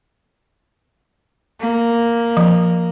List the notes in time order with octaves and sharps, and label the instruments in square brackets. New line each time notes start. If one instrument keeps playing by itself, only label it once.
[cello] A#3
[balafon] F3